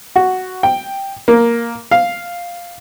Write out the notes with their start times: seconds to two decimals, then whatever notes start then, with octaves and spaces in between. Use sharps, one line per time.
0.16 F#4
0.63 G5
1.28 A#3
1.91 F5